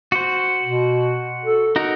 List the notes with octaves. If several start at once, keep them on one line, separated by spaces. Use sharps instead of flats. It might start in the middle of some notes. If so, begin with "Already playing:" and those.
F#4 C5
B2
A4
D#4 F#4 A#4